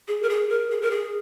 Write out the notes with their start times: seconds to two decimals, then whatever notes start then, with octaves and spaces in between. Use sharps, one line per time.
0.08 G#4
0.22 A#4
0.29 G#4
0.49 A#4
0.70 G#4
0.82 A#4
0.91 G#4